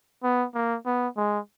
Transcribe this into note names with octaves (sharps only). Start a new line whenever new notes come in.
B3
A#3
B3
G#3